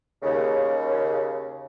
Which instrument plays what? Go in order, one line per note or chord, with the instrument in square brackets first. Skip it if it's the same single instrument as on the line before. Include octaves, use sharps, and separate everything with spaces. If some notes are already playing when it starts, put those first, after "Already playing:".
[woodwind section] D#2 C#3